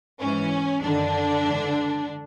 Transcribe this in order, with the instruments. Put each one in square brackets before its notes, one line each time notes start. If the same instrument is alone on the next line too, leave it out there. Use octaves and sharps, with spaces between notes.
[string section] G#2 E3 C#4
F#2 D3 D#3 D4
G#2 E3